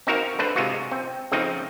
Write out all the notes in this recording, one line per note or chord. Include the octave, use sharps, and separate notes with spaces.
C4 D#4 F#4 A#4 C5 F5
A3 D4 B4 C5
C3 G#3 F4 F#4
C4
C#3 F3 A3 C4 D#4